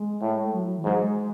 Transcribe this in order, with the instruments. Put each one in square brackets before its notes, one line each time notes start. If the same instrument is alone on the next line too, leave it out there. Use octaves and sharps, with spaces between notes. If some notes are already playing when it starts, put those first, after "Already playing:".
Already playing: [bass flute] G#3
[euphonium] A2
[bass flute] F#3
E3
[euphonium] G#2 [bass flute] F#3
[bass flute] G#3